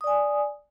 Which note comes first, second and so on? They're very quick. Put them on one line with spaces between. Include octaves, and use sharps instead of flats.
D#6 D5 G#5